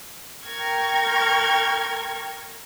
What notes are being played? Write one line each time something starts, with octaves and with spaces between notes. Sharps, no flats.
A#4 G5 C#6 F6 G#6